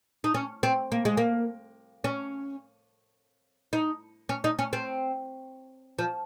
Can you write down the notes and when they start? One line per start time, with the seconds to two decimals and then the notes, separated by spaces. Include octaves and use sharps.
0.24 D#4
0.34 C#4
0.63 C4
0.92 A#3
1.05 G#3
1.17 A#3
2.04 C#4
3.73 D#4
4.29 C#4
4.44 D#4
4.59 C#4
4.73 C4
5.99 F3